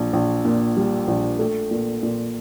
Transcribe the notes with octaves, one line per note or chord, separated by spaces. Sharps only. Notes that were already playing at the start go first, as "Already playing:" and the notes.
Already playing: A#1
A#1
A#2
G3
A#1
A3
A#2
A#2